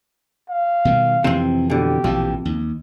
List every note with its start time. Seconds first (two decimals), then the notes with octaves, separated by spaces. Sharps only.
0.50 F5
0.85 B2 D#3 G3
1.24 F2 C3 E3 C4
1.70 B2 D3 G4
2.04 A#1 F2 B2 E3
2.45 D#2